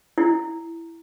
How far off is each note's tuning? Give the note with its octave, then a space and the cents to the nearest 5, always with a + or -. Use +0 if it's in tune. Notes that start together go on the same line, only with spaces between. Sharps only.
E4 +10